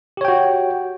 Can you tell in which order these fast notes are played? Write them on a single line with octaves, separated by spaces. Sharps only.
G4 C#5 G5 F#4